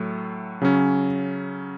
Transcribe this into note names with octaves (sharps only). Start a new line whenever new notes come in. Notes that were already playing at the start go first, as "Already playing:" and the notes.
Already playing: A2 F#3 A3
C#3 F#3 C#4